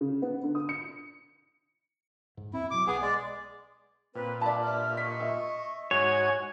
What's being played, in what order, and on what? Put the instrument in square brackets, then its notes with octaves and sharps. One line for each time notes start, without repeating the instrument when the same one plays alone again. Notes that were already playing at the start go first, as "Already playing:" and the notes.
[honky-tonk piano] C#3
B3
D3
D#6
C#7
[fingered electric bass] G#2
[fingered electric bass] E2 C4 [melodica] E4
[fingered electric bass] B2 F#3 [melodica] D6
[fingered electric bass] B1 [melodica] B3 G#4
[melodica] G#3 D5
[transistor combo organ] A#2 [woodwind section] C4 B4
[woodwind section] F4 E5 B5 [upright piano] D5 A5
[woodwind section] G2 E5 F6
[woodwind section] D#5 C#6 [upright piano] B6
[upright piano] E5
[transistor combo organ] G#2 F#4 G#5 [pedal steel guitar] C#5